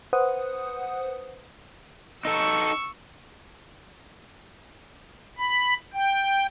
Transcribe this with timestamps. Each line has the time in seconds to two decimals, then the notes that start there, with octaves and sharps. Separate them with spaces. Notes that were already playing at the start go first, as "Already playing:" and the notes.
0.13 B4 C5 F#5 D#6
2.25 D#4 A4 C#6 E6
5.39 B5
5.93 G5